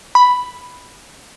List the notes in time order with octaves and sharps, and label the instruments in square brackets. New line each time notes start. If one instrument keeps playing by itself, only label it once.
[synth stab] B5